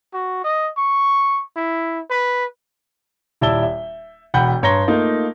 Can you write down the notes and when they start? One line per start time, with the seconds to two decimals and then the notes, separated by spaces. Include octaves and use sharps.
0.13 F#4
0.44 D#5
0.77 C#6
1.56 E4
2.10 B4
3.41 D#1 E4 D5 A5 E6 G7
3.63 E5
4.34 E1 F#5 G5 B5 G6
4.63 G2 C#5 A#5 C6 A#6 G7
4.88 A3 A#3 D#4 F4